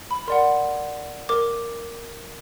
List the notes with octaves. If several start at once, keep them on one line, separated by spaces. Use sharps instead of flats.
B5
A#4 D5 F#5 C6
A#4 D6